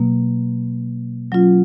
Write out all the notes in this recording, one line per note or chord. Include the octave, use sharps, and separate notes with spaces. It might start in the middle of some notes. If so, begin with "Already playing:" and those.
Already playing: B2 F#3 A#3
F#3 C#4 F4